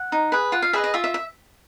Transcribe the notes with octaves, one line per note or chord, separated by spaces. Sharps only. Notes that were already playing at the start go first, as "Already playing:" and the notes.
Already playing: F#5
D#4
G#4 B4
F4 F#5
F5
G#4 B4 D#5 E5
D#5
F4 E5
E5
E5